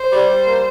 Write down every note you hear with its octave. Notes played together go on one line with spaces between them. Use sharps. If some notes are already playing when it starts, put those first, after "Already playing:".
Already playing: C5
G3
G3
A#3